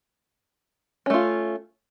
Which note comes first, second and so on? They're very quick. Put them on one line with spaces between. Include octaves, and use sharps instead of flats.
C#4 A3 F4